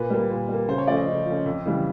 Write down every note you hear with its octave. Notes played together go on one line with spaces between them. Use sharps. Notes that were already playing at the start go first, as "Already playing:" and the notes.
Already playing: A#2 B4
G3 A#3
A#2
G3 A#3
C#3 C5
C#5
F3 A3 C#4 D5
D#5
C#3
F3 A3 C#4
F2
C#3 E3 G3